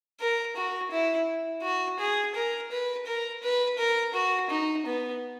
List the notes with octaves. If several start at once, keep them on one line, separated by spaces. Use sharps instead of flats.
A#4
F#4
E4
F#4
G#4
A#4
B4
A#4
B4
A#4
F#4
D#4
B3